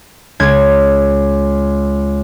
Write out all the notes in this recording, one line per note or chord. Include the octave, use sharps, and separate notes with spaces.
C#2 G#6